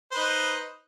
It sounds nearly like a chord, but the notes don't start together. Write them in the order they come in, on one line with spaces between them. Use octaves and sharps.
C5 B4 D#4